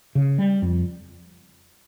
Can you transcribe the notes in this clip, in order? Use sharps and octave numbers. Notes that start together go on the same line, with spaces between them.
C#3
G3
F2